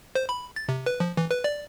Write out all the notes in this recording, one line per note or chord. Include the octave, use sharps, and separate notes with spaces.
C5
B5
A6
C3
B4
F3
E3
B4
D5